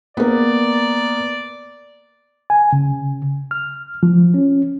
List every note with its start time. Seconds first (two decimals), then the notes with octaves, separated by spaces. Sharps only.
0.17 A#3 B3 D5
2.50 G#5
2.73 C#3
3.51 F6
4.03 F3
4.34 C#4